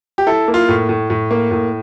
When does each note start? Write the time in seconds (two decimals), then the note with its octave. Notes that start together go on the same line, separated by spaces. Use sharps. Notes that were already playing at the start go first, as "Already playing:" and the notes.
0.18 G4
0.27 E4 A4
0.48 A#3
0.54 F4
0.69 A2
0.89 A2
1.10 A2
1.31 A#3
1.51 A2